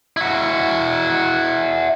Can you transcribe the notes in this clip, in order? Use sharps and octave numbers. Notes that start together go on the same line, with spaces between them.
E4 F#4